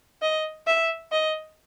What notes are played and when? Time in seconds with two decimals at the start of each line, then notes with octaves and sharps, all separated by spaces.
0.22 D#5
0.67 E5
1.12 D#5